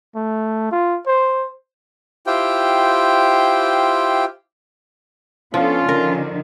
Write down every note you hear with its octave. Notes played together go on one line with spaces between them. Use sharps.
A3
F4
C5
E4 F4 G4 C5 G5
F3 B3 C#4 D4 F4 A4
D3 D#3 F3 A#4